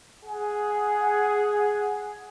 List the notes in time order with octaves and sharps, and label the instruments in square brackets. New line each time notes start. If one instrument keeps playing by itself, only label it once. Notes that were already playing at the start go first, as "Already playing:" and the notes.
[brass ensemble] G#4 F#5